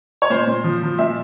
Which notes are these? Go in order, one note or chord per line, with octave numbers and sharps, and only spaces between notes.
C#5
A#2 C5
A#2
F3
F3
A#2 E5